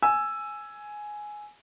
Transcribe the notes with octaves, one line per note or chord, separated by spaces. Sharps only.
G#5 E6